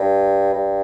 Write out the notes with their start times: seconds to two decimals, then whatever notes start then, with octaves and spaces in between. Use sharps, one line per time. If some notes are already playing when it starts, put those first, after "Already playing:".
Already playing: G2
0.53 G2